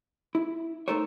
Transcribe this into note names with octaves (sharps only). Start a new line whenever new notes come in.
E4
A3 D#4 A4 A#4 C5 C#5